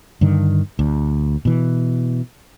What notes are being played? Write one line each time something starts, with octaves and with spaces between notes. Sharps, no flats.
G2 D3 D#3
D2
B2 E3